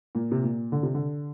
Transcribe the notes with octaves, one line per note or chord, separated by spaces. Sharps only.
A#2
C3
A#2
D3
C3
D3